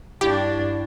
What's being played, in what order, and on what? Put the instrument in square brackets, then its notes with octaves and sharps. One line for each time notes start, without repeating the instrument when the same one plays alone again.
[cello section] G2 D4 [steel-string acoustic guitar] E4 F#4 F5 [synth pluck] G4